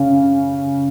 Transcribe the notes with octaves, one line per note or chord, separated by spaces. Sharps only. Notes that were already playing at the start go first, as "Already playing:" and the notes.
Already playing: C#3